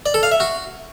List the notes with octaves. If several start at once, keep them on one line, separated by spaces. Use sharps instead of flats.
D5
A4
F5
E5
F#4